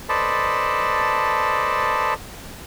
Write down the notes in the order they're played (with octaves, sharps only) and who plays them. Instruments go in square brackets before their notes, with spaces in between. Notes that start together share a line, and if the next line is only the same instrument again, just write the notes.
[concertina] A4 B4 C5 D5 D#5 A5